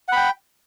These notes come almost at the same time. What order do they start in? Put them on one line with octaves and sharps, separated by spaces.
F#5 B5 G5